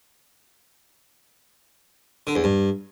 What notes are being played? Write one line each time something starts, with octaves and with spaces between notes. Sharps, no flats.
D3
E2
G2